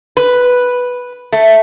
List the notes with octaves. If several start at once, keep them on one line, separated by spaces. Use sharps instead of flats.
B4
A3